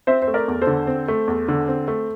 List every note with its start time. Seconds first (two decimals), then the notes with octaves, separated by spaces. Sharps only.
0.07 C4 C5 E5
0.22 C5
0.28 A3
0.34 A#4 D5
0.48 E2
0.62 A4 C5
0.67 D3
0.87 C4
1.08 A3
1.28 E2
1.48 D3
1.68 C4
1.88 A3